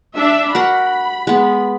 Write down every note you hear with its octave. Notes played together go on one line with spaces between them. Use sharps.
D4 E5
F#4 A#4 F#5 B5
G#3 B3